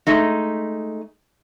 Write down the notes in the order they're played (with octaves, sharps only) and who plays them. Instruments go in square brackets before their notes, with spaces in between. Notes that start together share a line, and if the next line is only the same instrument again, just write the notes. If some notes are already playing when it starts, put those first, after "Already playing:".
[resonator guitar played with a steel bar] G#3 A3 D#4